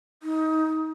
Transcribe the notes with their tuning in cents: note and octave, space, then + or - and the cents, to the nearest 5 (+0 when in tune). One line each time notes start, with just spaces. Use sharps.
D#4 +20